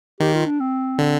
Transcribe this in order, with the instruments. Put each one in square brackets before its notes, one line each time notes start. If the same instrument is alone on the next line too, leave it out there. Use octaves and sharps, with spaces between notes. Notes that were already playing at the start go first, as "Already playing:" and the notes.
[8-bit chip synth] D#3 [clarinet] G4
[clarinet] F4
D4
C4
[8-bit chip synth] D3